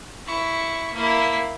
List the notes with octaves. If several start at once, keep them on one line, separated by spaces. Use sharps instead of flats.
E4 C#6
A#3 E4